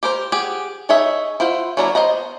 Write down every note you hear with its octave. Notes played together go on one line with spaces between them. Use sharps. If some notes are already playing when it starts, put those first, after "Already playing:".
G4 A#4 C5
G4 G#4 F#5
D#4 G#4 C#5 D#5 E5
E4 F4 C5 F#5
F#3 A#3 D4 E4 A#5
B3 C5 D#5 F#5 A#5